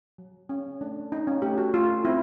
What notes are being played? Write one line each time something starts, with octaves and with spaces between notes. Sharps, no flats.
F#3
C#4
A3 D4
C#4 D#4
C#4
A3 G4
F#4
A3 F4
C4 E4